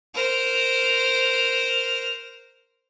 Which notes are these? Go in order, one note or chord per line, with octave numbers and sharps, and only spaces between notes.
A#4 C5